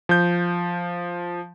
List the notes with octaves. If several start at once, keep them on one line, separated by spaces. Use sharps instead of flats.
F3 G6